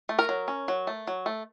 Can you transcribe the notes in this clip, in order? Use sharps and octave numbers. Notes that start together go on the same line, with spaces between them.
A3
A#4 A#5
F#3
C#4
F#3
A3
F#3
A3